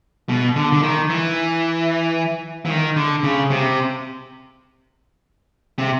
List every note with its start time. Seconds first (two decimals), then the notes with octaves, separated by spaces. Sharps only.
0.29 B2
0.56 D3
0.72 D3
0.83 D#3
1.10 E3
2.66 E3
2.70 D#3
2.96 D3
3.23 C#3
3.50 C3
5.78 C3